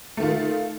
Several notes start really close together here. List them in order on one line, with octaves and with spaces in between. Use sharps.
A3 D#3 F4